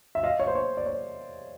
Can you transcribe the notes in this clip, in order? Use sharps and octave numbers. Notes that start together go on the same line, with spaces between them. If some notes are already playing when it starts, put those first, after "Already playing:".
E5
D#5 F5
C#5
C5
C#5
D5
C#5